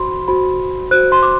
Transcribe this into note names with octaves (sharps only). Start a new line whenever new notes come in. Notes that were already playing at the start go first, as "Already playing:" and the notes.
Already playing: F#4 C5 B5 C6
F#4 C5 B5
F#4 C5 F#6
C6
D6